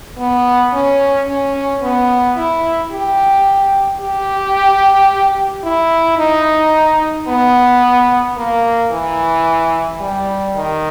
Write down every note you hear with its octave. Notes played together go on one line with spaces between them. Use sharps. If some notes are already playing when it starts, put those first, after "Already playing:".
B3
C#4
C#4
B3
E4
G4
G4
E4
D#4
B3
A#3
E3
G3
D#3